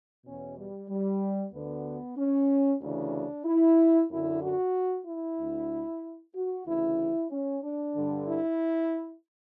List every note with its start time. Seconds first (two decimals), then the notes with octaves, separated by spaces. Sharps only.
0.24 E2 B2 C#4
0.57 G3
0.88 G3
1.53 D2 D3 B3
2.17 C#4
2.81 D2 C#3 E3 D4
3.45 E4
4.10 F#2 D3 E4
4.42 F#4
5.06 E4
5.39 D2 D3
6.35 F#4
6.67 D2 C#3 E3 E4
7.30 C#4
7.63 D4
7.94 G2 D3
8.27 E4